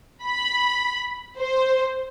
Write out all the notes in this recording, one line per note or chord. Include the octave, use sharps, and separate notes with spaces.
B5
C5